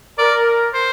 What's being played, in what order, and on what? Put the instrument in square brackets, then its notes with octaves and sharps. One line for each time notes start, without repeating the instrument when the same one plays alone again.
[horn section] A#4 [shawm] D5
[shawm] C5